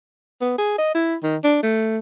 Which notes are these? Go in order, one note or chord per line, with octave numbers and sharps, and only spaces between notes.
B3
G#4
D#5
E4
D#3
D4
A3